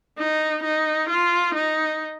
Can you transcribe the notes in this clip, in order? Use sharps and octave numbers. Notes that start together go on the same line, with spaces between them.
D#4
D#4
F4
D#4